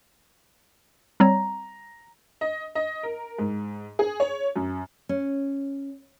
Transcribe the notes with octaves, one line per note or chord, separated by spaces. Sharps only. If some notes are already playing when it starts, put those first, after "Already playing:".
G3 C4 C#5 A#5
D#5
D#5
A#4
G#2
G#4
C#5
F#2
C#4